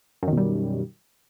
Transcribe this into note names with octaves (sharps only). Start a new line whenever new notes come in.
F#2 B2 D#3 G3